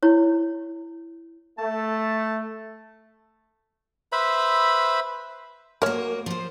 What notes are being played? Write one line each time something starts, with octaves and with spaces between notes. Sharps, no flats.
E4 C#5
A3 A5
B4 C5 E5 B5
A#3 F#4 A#4 C#5
F3 C5